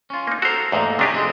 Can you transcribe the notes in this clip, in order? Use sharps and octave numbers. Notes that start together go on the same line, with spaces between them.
C#4 F4
A#3 D#4
F#4 A4 A#4 C5
E2 G#2 A3 A#3 D#4
C3 D4 G4 G#4 C#5 D#5
F2 G#3 C4